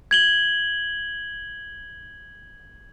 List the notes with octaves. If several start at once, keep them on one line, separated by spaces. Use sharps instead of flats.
G#6 F#7 G7